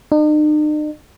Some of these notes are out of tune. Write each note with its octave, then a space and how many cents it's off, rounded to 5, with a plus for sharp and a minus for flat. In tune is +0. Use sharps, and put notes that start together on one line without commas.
D#4 -45